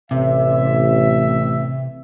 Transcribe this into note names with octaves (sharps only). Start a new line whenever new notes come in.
A1 C3 E5